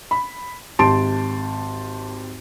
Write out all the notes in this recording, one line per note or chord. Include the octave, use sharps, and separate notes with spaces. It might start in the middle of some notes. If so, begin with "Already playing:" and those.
B5
G#1 G4 A5 C6 D7